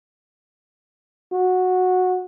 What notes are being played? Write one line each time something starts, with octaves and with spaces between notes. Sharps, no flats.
F#4